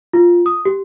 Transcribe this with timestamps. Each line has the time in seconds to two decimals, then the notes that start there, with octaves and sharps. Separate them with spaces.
0.13 F4
0.46 D#6
0.65 G4